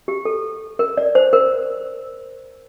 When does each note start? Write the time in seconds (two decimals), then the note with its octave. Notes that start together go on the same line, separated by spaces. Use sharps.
0.08 G4
0.25 A4
0.79 A#4
0.97 D5
1.15 C5
1.33 A#4